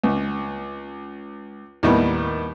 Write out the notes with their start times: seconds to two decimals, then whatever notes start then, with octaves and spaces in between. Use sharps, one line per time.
0.04 C#2
1.83 D#2 A2 D#3 G3 B3